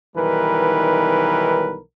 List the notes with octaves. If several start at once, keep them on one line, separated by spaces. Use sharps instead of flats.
B1 D#3 E3 G3 A#4 B4